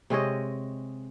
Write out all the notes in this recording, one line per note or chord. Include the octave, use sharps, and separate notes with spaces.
C3 G#3 C#5 D#5